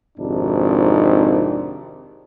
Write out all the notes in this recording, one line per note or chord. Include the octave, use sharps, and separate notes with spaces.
G#1 F2 C3 D4 D#4